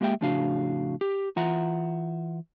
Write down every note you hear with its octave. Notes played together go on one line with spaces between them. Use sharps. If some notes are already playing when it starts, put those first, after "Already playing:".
G#3 A#3 G4 E5 G5
F2 A2 C#3 D4 F#4 F5
G4
E3 F4 E5 F#5 A#5